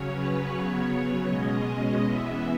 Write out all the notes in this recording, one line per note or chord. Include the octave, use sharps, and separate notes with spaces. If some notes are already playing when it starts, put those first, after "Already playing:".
Already playing: C#3 F#3 C#4 C#5
B4
C#3 F#3 B3 C#5
C#5
B2 G#3 C#4 D#5
D#5
E3 B3 E5